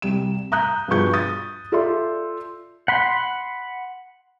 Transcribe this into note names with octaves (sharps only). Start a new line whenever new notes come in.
C2 G3 E7
A#5 D#6 F#6 G6
G2 B2 F3 G#4 C#6 G6
D#6 A6
F4 A4 D5 E5 C6
F#5 B5 C6